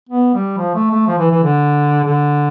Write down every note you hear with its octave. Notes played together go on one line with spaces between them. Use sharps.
B3
G3
F3
A3
A3
F3
E3
E3
D3
D3